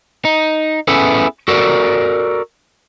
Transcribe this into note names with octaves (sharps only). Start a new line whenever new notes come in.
D#4
B3 C#4 E4 G#4 A4 B4
F#4 A4 A#4 D5